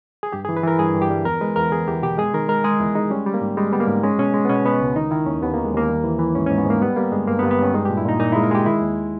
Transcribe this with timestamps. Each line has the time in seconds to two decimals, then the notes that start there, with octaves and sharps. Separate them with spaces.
0.23 G#4
0.33 G2 G4
0.45 G#4
0.49 E3
0.57 B4
0.63 E3 A#4
0.79 G2 G#4
0.94 G2
1.02 G4
1.10 G3
1.25 E2 A#4
1.41 G#3 B4
1.56 E2 A#4
1.72 E2 G#4
1.88 E2 G4
2.02 B2 G4
2.18 G#3 G#4
2.34 D#3 A#4
2.48 G#3 A#4
2.64 G#3 G#4
2.80 E2 E4
2.95 G#3 D#4
3.10 G3 C#4
3.26 G3
3.34 A#3
3.41 G#2
3.57 G3 G#3
3.73 G3 B3
3.80 A#3
3.88 G#2
4.04 G#3 C#4
4.19 B2 C#4
4.34 G#3
4.45 B3
4.50 B2 C#4
4.65 B2 B3
4.81 C#2
4.96 D#3 D#4
5.11 D#3 E4
5.26 D#2 C#4
5.42 D#2 B3
5.54 A#3
5.58 D#3
5.65 G#3
5.74 D#2 A#3
5.88 G3
6.04 E3
6.19 E3
6.35 G#2 C#4
6.47 C#4
6.51 G#2
6.58 B3
6.65 G#2 A#3
6.82 G3 B3
6.96 G3 A#3
7.12 G2 G#3
7.28 G2 A#3
7.39 B3
7.43 G2
7.51 B3
7.59 G2 C#4
7.74 G#3 D#4
7.85 G4
7.90 A#2
7.97 E4
8.05 A#2 D#4
8.20 A#2 D#4
8.32 E4
8.36 G#3
8.43 A#4
8.51 G#3 G4
8.66 D#3 E4
8.81 D#2